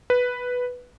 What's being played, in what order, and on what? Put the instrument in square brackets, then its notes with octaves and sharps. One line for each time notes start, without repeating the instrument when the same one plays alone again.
[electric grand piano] B4